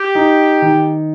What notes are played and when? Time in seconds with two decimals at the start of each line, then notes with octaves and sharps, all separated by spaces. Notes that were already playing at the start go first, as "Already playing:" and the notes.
Already playing: G4
0.15 D#4
0.62 D#3